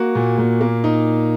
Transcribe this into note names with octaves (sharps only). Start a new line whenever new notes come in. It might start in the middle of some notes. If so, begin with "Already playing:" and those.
Already playing: A#3 F#4
A#2
A#2
A#3
D#4